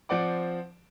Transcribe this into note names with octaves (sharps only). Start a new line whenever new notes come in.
F3 C4 D5 F#5 D6